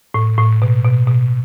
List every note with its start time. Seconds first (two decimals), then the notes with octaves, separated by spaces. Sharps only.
0.14 A2
0.38 A2
0.62 B2
0.84 B2
1.08 B2